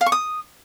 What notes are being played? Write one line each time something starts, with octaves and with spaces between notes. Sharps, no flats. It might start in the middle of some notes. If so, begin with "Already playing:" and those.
F5
C#6
D#6